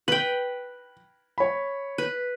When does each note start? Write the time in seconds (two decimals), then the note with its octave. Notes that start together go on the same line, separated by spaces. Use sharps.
0.08 B4 G5 F#7
1.38 C#5 B5
1.98 B4